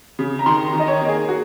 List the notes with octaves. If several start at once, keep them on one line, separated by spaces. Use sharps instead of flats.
C#3
A#5
D#3 C6
A#5
D#3
D#5
C#5
A#3
G#4
F#4